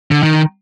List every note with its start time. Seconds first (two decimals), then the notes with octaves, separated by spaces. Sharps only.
0.11 D3
0.23 D#3